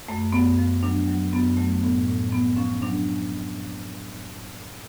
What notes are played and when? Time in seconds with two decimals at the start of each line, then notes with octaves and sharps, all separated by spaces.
0.08 F#2 A3
0.32 F#2 B3
0.59 F3
0.83 F#3 D4
1.08 F#3
1.33 F#2 B3
1.57 F#3 A3
1.82 A2 B3
2.07 A2
2.32 F3 B3
2.56 F3 C#4
2.82 F#3 D4